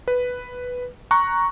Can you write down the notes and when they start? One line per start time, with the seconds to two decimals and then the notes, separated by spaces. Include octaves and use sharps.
0.08 B4
1.11 A#5 C#6 F#6